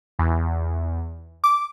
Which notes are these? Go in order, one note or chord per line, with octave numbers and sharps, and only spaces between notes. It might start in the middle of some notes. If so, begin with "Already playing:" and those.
E2
D6